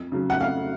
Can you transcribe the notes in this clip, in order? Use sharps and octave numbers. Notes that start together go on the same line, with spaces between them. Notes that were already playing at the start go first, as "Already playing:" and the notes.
Already playing: F2
C#3 F#3
F#5
F2 F5